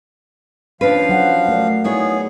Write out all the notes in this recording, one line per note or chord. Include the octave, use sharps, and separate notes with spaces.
F3 C#4 D4 B4 F5
F#3 F#5
A3 A#4 D5
B3 D#4 E4 G#4 C#5